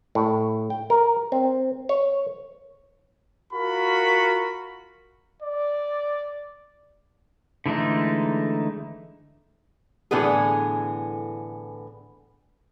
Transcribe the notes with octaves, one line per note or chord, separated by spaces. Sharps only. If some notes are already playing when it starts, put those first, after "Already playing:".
A2
G5
A#4
C4
C#5
F4 F#4 A#4 B5
D5
D3 E3 G#3 A3 D#4
A2 D3 E3 B3 G#4